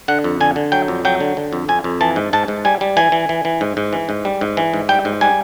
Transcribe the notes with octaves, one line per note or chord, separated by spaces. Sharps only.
D3 F#5
F2
D3 G#5
D3
F#3 G5
F2
F#3 G5
D3
D3
F2
F2 G#5
F2
E3 A5
G#2
G#2 A5
G#2
G3 G#5
G3
E3 G#5
E3
E3
E3
G#2
G#2
E3
G#2
G3
G#2
E3
G#2
G3 G5
G#2
G3 G#5